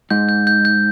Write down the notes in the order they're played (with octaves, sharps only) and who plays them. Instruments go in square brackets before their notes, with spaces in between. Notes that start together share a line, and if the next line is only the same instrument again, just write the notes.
[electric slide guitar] G#2 [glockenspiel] G6
[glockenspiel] G6
G6
G6